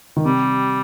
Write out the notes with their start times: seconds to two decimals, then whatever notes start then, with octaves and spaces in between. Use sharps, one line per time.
0.16 D#3
0.25 C3 G3